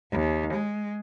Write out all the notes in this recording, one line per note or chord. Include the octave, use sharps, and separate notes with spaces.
D#2
G#3